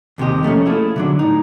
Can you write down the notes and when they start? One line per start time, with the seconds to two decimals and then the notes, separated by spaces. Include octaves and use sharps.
0.18 D#2 C3 G#3 G4 D#5
0.43 F3 A3 A#3 C#4
0.65 A3 E4 F4 G#4 A4
0.96 D3 F#3 D4
1.19 A2 D#4